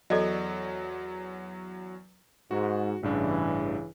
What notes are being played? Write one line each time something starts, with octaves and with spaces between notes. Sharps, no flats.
E2 F#3 A4 D5 D#5
G#2 F#4
A1 G2 C#3 E3 D4